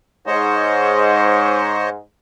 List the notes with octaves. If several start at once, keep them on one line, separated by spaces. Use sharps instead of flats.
G#2 C5 C#5 D#5